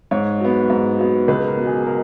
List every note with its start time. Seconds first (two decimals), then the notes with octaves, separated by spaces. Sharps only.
0.11 G#2 C#5
0.40 F#3 B3
0.70 G#2
0.99 F#3 B3
1.28 C#2 B4
1.48 A#4
1.57 B2 F#3
1.67 G#4
1.86 A#4